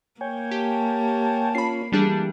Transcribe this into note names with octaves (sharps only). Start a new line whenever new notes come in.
A#3 C#5 G5 G#5
G4 A5
C#4 F4 C#5 B5 C7
E3 G3 A3 D4 G4 G#4 A5